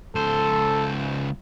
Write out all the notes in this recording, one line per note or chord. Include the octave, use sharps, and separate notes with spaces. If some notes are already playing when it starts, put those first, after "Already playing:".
C#2 A4 C5